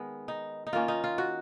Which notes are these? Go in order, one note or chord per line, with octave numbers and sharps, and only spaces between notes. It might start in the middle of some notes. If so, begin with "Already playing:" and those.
Already playing: D#3 G#3 B3
D#4
D#4
D#3 A#3 C#4 F4
D#4
F4
F#4